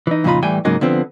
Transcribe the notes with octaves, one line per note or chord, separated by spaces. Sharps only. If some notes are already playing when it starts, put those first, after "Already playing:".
E3 D#4
F2 A#2 C#3 D#4 F4 B5
A2 E3 G3 G5 G#5
G#2 C#3 F#3 G#3 A#3 D#4
D3 F3 B3 C4